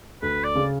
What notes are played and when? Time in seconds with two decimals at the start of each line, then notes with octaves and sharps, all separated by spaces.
0.22 D2 B4
0.44 D5
0.55 C#3